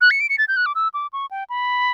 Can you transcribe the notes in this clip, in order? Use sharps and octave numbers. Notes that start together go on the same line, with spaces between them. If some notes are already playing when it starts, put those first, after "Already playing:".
F#6
C#7
D7
C#7
A6
G6
F#6
D6
E6
D6
C#6
G5
B5